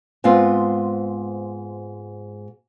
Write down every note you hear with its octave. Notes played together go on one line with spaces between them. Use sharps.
G#2 B3 C4 F4